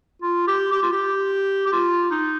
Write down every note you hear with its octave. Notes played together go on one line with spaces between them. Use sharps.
F4
G4
G4
F4
G4
G4
F4
D#4